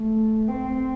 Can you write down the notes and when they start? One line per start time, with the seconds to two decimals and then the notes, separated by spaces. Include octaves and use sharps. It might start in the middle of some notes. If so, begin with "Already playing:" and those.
Already playing: A3
0.48 C4